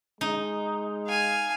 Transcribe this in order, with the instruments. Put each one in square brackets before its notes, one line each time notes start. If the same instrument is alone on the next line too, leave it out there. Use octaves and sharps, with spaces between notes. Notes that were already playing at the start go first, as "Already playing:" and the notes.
[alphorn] G#3 [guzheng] D#4
[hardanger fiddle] F5 G#5